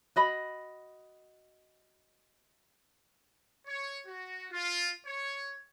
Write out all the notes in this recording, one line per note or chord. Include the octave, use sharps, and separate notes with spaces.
F#4 D#5 B5
C#5
F#4
F4
C#5